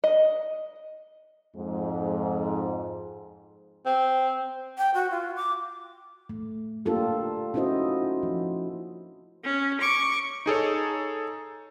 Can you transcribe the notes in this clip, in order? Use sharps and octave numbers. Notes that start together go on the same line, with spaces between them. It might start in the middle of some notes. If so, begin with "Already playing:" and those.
D#5
F2 G#2
C4
G5
F#4
F4
D6
A3
A#3 D4 F4 G4 A4 A#4
C#4 D#4 E4 F#4 C5 D#5
F3
C#4
C#6 D6
D#4 G#4 A4 C#5